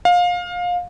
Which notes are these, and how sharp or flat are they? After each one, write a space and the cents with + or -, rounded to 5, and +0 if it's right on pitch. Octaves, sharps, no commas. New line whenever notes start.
F5 +25